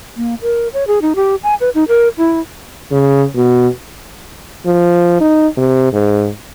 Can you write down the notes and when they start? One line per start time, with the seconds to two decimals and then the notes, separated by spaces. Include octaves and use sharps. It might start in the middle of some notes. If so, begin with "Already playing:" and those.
0.17 A#3
0.42 A#4
0.74 C#5
0.87 G#4
1.02 D#4
1.16 G4
1.43 G#5
1.61 B4
1.75 D#4
1.88 A#4
2.18 E4
2.92 C#3
3.35 B2
4.66 F3
5.21 D#4
5.57 C3
5.93 G#2